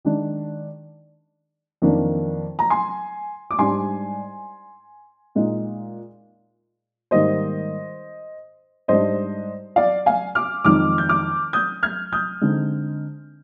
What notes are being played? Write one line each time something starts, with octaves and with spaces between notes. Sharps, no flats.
D#3 G#3 D4
F2 D#3 A#3 D4
A#5
G#5 C6
D6
G#2 G3 D4 G#5 C6
A#2 G#3 D#4
G#2 D#3 G3 A#3 C5 D#5
G#2 G3 D4 C5 D#5
D5 F5
F5 G#5
D6 F6
F2 D#3 G#3 D#4 D6 F6
G6
D6 F6
D#6 G6
F6 G#6
D#6 G6
D3 G#3 C4 D#4